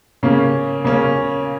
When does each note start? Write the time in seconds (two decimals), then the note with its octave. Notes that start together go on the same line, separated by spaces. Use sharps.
0.23 C#3 A#3 C#4
0.84 C#3 A#3 C#4